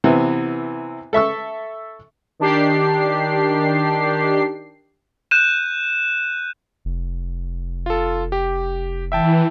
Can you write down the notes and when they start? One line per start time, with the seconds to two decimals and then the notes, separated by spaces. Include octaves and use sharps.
0.04 C3 E3 B3
1.13 A4 E5 C#6 E6
2.40 D#3 D4 G4 C7
5.31 F#6 G6 D#7 E7
6.85 F1
7.86 F4 A4
8.32 G4
9.12 E3 E5 G5 A5